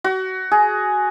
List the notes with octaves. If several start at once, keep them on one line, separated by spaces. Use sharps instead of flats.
F#4
G#4